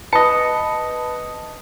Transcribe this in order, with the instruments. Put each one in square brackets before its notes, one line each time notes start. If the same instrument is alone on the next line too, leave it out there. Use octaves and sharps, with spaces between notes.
[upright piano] B4 A5 B5 [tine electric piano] D#5 C#7